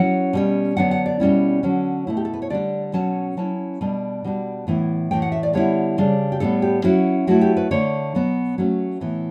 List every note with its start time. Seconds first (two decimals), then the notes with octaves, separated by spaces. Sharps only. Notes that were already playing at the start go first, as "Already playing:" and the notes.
Already playing: F#3 C#4 E4 F#5
0.33 B2 G3 C#4
0.77 D3 F#3 B3 D4 F#5
0.91 F#5
1.06 D5
1.20 B2 G3 C#4 E4
1.63 D3 F#3 C#4
2.07 B2 A3 E4
2.17 G4
2.25 A4
2.34 B4
2.42 C#5
2.50 D3 G3 D4 D5
2.93 B2 F#3 C#4 A5
3.37 F#3 C#4 E4 A5
3.81 B2 G3 D4
4.24 B2 G3 D4
4.67 A2 E3 B3 E4
5.11 A2 E3 A3 G5
5.22 F#5
5.32 E5
5.43 D5
5.54 D3 G3 B3 E4 C#5
5.98 C#3 G3 D4
6.32 G4
6.40 A2 G3 B3 A4
6.62 G4
6.84 F#3 C#4 E4 F#4
7.27 F#3 A3 E4 F#4
7.41 G4
7.57 B4
7.71 D3 A3 D4 C#5
8.15 B2 F#3 B3
8.58 F#3 A3 C#4
9.01 A2 E3 B3 E4